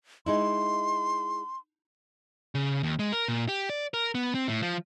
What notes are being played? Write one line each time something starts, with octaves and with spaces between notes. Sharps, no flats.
G#3 D#4 E4 C6
C#3
D#2
G#3
A#4
A#2
G4
D5
A#4
B3
C4
A2
F3